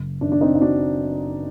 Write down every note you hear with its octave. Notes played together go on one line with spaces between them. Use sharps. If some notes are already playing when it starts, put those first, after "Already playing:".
Already playing: F#1
F#2 D#3 D4
D4
C4 D#4
D#4
D4 F#4